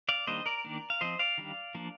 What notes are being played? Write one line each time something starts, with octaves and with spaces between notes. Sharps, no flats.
D5 F5
D#3 G3 A#3 D4 C5 D#5
A#4 D5
D#3 A#3 D4
F5
F3 C4 C5 D#5
D5 F5
D#3 G3 D4
F3 A#3 D4